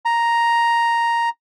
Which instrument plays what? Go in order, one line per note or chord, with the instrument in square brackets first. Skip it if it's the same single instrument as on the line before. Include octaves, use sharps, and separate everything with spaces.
[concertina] A#5